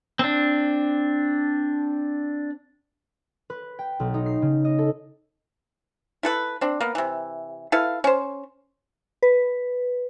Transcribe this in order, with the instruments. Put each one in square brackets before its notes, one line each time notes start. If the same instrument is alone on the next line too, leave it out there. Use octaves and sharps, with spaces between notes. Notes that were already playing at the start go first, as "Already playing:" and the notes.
[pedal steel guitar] C4 D4
[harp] B4
G5
B1
D#4
C7
C#3
D#5
A4
[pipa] E4 A4 B4
C4 D4
A#3 B3
C3 E3
E4 A4 B4 F5
C#4 C5
[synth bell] B4